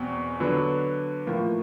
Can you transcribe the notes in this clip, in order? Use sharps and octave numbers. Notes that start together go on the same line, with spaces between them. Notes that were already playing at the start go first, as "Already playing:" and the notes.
Already playing: E2 B2 C4
D3 F#3 B3 D4
A2 F3 A#3